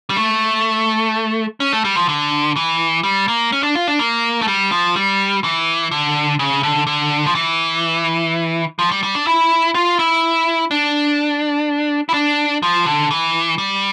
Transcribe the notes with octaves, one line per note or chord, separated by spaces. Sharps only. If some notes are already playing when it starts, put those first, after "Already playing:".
G3
A3
C#4
A3
G3
F3
D3
E3
G3
A#3
C#4
D4
F4
D4
A#3
A3
G3
F3
G3
E3
D3
C#3
D3
D3
F3
E3
F3
G3
G3
D4
E4
F4
E4
D4
E4
D4
F3
D3
E3
G3